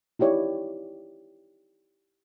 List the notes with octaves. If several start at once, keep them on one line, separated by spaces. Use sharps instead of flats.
D#4 E4 G4 C#5 D5